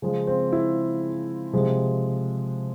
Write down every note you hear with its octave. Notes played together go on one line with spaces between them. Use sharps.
C#3 F3 G#3
C4
E4
C3 F3 G#3